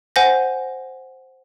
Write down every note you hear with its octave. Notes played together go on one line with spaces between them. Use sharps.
C5 F#5 G#5 G6 A#6